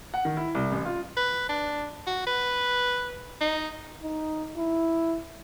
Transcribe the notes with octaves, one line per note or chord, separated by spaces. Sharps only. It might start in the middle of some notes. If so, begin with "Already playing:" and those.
F#5
D#3
E4
C2
A1
F4
B4
D4
F#4
B4
D#4
D#4
E4